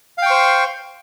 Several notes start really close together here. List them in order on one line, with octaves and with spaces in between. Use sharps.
F5 G5 C#6 C5